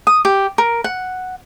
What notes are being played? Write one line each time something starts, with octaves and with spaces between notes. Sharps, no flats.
D#6
G4
A#4
F#5